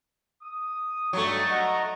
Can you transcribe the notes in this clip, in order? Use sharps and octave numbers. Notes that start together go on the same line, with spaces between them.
D#6
G2 F#3 A3 D#4 F#4
D#5 F#5 A#5